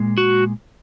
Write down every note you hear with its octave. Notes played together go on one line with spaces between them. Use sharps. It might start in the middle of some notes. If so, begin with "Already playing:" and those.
Already playing: A#2 G#3
F#4